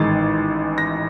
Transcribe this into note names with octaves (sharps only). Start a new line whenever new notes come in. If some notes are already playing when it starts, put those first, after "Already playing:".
Already playing: A1 G#2 D#3 G#3 A6
A#6